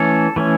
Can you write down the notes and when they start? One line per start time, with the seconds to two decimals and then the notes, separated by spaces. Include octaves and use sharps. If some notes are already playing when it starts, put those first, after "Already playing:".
Already playing: E3 A3 C#4 A4
0.36 E3 A3 C#4